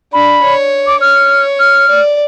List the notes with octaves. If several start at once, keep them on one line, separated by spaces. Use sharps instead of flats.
D4 B5
C#5
D6
C#5 F6
F6
D5